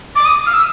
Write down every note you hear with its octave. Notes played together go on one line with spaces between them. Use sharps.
D6
D#6
F6
E6